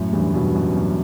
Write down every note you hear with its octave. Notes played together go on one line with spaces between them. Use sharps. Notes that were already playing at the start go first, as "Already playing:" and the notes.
Already playing: F#2 A2
E2 G2
G2 B2
F#2
F#2